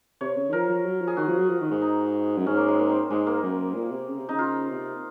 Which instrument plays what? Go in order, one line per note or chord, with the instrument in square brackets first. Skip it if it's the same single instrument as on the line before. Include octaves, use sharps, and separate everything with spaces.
[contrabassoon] C3 [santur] C#5
[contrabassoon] C#3
D#3
[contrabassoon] F3 [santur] A#4
[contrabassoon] F3
F#3
F3
[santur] G#4
[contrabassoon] D#3 [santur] F#4
[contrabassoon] F3
F#3
F3
D#3
G#2
[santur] D#4
[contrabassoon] F#2
[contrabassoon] G#2 [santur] C#4
[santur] A#3
G#3
A#3
C4
[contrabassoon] G#2 [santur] G#3
[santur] A#3
[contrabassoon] F#2
A#2
C3
C#3
C3
[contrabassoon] C#3 [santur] D#4
[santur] F4
[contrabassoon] C3